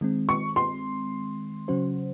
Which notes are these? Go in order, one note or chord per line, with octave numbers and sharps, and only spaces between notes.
D#3 G#3 C4
C#6
C6
C#3 F#3 C#4 F#4 C5